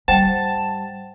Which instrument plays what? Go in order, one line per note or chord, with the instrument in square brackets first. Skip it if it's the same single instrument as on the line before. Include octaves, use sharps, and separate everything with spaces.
[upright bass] G#2 G3 [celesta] C5 F#5 G5 [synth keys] A5